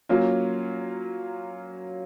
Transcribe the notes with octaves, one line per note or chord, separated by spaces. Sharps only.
F#3 A#3 C#4 F4